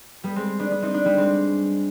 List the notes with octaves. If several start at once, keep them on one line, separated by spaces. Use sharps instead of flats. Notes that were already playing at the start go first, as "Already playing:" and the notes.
G3 B3
G#3 C4
B3 D4
B3 D4
C4 D#4
B3 D4
G3 B3
G#3 C4